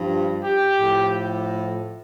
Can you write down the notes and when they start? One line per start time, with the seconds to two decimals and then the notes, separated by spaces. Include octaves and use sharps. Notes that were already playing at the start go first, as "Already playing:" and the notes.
Already playing: G2 F3
0.42 G4
0.77 A2 F3